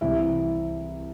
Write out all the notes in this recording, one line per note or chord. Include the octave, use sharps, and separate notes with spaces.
C2 C3 E3 E4 E5